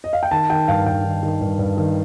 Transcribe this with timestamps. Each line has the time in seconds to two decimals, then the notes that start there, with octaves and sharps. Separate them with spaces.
0.04 D#5
0.13 F5
0.23 G5
0.31 D#3 A5
0.50 D#3 G5
0.68 G2 F5
0.82 A5
0.86 G2 G5
1.04 D#3
1.23 D#3
1.41 G2
1.59 G2
1.77 D#3